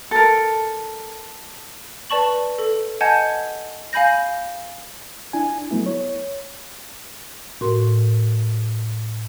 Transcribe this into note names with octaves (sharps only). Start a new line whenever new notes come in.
A4 A#4
B4 D5 A5 C#6 F#7
A4
D#5 F#5 G#5 A5 G6 G#6
F5 G#5 B5 G6 A#6
D4 E4 G#5
F#3 A3 B3 E4
C#5
A2 F#4 A#4 C6